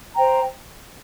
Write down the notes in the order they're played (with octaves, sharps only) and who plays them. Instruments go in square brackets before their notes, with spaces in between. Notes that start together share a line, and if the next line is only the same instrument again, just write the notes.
[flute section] C5 G5 A#5